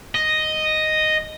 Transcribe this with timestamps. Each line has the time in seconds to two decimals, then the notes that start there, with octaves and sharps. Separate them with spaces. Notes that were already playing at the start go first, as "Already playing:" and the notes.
0.15 D#5